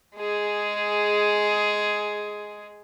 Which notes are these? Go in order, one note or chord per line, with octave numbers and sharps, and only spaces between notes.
G#3 G#4